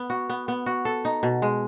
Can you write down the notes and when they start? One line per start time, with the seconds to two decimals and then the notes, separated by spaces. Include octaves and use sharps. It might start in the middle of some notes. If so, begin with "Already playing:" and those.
Already playing: B3
0.10 F#4
0.30 B3
0.48 B3
0.66 F#4
0.85 A4
1.05 D#4
1.23 B2
1.42 G#3